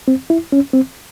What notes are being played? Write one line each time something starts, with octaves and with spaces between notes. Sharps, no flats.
C4
E4
C#4
C4